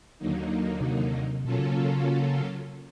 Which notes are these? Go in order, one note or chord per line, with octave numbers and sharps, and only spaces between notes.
D#2 D3 F#3 A#3 D#4
C3
B2 F#3 A#3 C#4 F4 A4
C#3